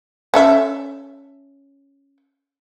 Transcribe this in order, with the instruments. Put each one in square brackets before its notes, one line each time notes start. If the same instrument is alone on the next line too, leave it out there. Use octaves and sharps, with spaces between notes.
[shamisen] C#4 A4 E5